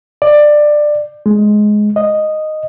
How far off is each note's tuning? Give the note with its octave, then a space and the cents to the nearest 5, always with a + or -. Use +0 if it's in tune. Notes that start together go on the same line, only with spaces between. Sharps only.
D5 +15
G#3 +15
D#5 -5